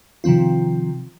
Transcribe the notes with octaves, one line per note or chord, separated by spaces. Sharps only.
C3 D#3 F3 C4 F4